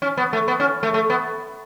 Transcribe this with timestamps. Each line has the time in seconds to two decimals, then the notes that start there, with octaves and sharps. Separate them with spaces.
0.02 C#4
0.17 B3
0.33 A3
0.48 B3
0.60 C#4
0.83 A3
0.94 A3
1.10 B3